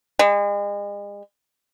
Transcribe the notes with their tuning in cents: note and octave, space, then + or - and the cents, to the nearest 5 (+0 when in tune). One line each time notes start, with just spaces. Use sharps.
G#3 -40